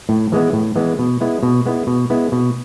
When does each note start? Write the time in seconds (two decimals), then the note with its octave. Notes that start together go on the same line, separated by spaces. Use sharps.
0.09 A2
0.32 E3 G#3 B3
0.53 A2
0.76 E3 G#3 B3
0.99 B2
1.21 G#3 B3 E4
1.43 B2
1.66 G#3 B3 E4
1.87 B2
2.10 G#3 B3 E4
2.32 B2